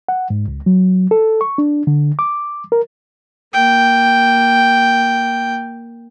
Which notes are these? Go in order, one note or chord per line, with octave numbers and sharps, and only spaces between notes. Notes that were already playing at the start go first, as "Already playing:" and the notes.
F#5
G#2
C#2
F#3
A4
C#6
D4
D3
D6
A#4
A#3 G5